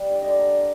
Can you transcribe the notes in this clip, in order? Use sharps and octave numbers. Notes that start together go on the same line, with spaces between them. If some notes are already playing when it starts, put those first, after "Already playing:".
Already playing: G3
D3
D5
D#5
D3 D5
A#4
D3